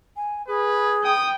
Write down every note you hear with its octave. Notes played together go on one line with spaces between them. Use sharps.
G#5
G#4 B4
G5 D#6